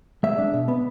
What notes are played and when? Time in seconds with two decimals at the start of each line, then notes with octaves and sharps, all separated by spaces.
0.23 G#3 E5
0.38 D4
0.54 B2
0.68 B3